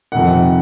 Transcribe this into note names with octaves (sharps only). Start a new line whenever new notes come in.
F2 C3 D#3 F#5